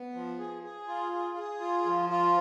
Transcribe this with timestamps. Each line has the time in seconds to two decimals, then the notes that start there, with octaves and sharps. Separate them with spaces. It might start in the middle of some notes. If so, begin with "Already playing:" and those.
Already playing: B3
0.14 F3
0.39 G#4
0.63 G#4
0.88 F4
1.12 G#4
1.36 G#4
1.60 F4
1.86 F3
2.09 F4